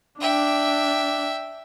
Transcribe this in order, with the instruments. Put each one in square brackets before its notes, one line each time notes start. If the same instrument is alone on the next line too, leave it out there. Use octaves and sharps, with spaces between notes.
[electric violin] D4 [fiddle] E5 G5